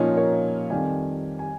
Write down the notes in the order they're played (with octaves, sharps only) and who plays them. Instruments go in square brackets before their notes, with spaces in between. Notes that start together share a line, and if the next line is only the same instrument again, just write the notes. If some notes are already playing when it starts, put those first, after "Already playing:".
Already playing: [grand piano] A#2 F3 A#3 D#4 [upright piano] C#4 F4
[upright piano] A#4 C#5
[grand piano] F2 D#3 G3 [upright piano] F5 G#5
[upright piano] G#5